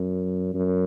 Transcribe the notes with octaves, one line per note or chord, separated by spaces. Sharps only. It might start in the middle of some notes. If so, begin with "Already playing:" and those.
Already playing: F#2
F#2